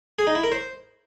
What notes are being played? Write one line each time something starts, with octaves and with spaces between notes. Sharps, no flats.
G#4
D#4
E4
A#4
C5